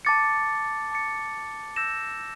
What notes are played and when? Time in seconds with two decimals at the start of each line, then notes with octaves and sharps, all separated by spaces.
0.05 A5 D6 A6 C#7
0.92 A5 D6 A6 C#7
1.76 E6 G6 A#6 E7